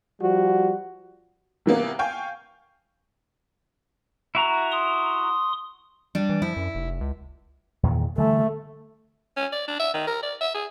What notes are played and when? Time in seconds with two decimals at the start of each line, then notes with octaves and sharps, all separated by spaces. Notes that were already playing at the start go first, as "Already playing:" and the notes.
0.21 F3 G3 F#4
1.66 C3 E3 A#3 B3
1.99 F5 G5 G#5 C#6 G6
4.35 E4 F#4 A#5
4.71 C6 D#6
6.15 G3 D4
6.29 E3
6.42 F3 E4
6.57 F#2
6.75 F1
7.01 C#2
7.83 E2 A#2 D#3
8.18 D3 E3 G3 A3
9.37 C#4
9.52 D5
9.68 D4
9.79 E5
9.94 D#3
10.07 A#4
10.23 D5
10.41 E5
10.54 G#4